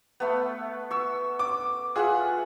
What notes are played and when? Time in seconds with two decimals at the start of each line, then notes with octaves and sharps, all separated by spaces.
0.20 A3 B3
0.91 C#6 E6
1.39 D6
1.96 F4 G#4 E5 F#5